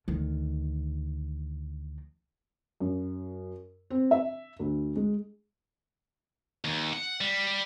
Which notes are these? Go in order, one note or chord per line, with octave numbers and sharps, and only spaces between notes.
D2 D#3
F#2
C4
E5
D2
G#3
D#2
F#5
G3